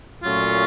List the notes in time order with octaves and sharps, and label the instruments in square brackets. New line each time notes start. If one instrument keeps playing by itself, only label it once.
[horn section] A#2 F#3 A3 C#4 [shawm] F4